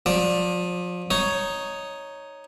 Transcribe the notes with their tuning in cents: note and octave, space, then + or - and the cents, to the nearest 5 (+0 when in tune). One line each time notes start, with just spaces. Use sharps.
F3 +30 D5 +0
D#4 +0 C#5 +5